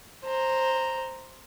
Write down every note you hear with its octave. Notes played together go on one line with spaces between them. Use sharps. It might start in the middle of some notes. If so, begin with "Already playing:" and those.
C5 A#5